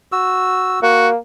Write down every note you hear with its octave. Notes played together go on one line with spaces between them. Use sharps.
F#4 E6
A#3 F#4